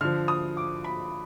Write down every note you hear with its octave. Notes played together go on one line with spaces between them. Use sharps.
D3 F3 F6
D#6
D6
B5